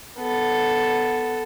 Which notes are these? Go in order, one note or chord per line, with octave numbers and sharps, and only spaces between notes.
B3 A4